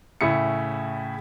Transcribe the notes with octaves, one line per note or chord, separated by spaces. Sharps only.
A2 C#3 E4 C#7